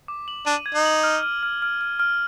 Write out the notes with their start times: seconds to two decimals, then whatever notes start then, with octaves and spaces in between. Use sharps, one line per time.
0.08 D6
0.28 F#7
0.46 D4 D#7
0.66 G#6
0.75 D#4
0.85 F#7
1.03 F6
1.23 F6
1.43 F6
1.62 F6
1.81 F6
2.00 F6